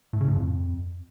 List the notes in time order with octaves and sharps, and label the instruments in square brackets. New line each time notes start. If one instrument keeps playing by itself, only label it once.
[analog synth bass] A2
C#3
A2
F2